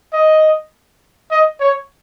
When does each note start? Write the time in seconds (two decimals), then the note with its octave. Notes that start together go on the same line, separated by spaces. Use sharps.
0.13 D#5
1.31 D#5
1.60 C#5